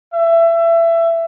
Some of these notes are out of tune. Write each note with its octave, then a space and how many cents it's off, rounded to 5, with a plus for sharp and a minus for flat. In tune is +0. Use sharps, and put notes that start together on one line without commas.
E5 +25